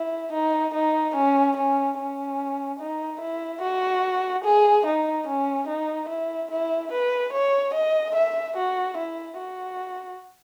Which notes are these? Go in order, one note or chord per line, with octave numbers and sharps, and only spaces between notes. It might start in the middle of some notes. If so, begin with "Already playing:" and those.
Already playing: E4
D#4
D#4
C#4
C#4
C#4
D#4
E4
F#4
G#4
D#4
C#4
D#4
E4
E4
B4
C#5
D#5
E5
F#4
E4
F#4